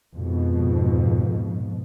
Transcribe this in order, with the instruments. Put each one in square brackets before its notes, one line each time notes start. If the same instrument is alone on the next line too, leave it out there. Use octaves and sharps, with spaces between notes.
[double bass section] F2 G#2 B2